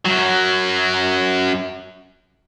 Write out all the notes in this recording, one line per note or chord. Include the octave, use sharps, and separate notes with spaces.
F#2 F#3